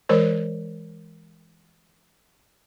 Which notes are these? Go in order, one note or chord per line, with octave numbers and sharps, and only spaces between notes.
E3 G#3 A#4 C5 C#5